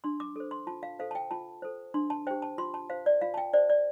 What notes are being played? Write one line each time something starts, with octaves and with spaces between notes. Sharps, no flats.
D4 C6
D6
A4 C5
C6
F4 A5
F5
A4 C5 F5
A5
G5
F4 A5
A4 C5
D4 C6
A5
G4 C5 G5
A5
F4 C6
A5
C5 F5
D5
F4 F5
A5
G5
C5 D5
D5